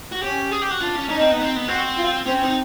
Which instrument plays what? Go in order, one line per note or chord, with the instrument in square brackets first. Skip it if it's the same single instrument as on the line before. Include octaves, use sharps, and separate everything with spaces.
[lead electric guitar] F#4
[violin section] C#4 [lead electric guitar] G4
[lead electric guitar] G#4
G4
F#4
[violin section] D4 [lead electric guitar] F4
[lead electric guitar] C#4
[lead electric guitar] C#4 [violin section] D#4
[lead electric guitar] C4
B3
C4
B3
[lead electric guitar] C4 [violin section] F#4
[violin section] F4
[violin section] C4 [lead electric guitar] C#4
[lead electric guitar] D#4